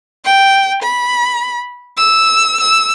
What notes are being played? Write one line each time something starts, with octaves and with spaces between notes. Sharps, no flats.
G5
B5
E6
E6